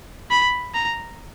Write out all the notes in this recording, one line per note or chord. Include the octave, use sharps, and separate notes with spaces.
B5
A#5